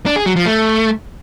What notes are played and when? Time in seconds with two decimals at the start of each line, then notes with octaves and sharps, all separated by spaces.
0.06 D4
0.16 G#4
0.26 F#3
0.36 F3
0.46 A3